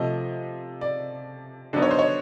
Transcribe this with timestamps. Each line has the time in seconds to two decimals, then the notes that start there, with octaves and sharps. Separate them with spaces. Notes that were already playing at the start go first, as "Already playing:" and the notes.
Already playing: C3 F3 A3 D#5
0.81 D5
1.73 D3 F#3 B3 D#4 D5
1.82 C#5
1.91 C5
1.99 C#5